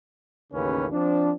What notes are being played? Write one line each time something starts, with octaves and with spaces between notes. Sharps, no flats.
A1 D#2 C#3 C#4 B4
F3 C4 D4